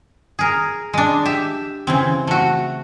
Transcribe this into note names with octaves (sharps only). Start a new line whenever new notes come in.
G#4 A#4
G#3 D4
G4 E5
C#3 E3 C4
A3 F#4